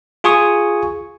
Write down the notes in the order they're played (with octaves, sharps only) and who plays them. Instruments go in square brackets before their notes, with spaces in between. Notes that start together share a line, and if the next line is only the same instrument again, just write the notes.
[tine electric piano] F4 G#4 G#5 C#6 D#6